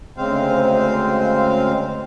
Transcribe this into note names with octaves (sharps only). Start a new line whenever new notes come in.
D2 C#3 G#3 C4 C5 F5